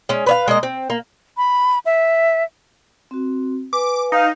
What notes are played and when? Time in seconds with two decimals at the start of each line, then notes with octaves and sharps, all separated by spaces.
0.09 G#3 C#4
0.26 B4 C#5 F5
0.48 G#3 A#3 D#5
0.63 C4
0.90 A#3
1.37 B5
1.86 E5
3.11 C4 F#4
3.73 B4 G#5 D6
4.12 D#4 F5